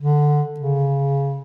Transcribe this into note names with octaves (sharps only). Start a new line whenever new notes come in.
D3
C#3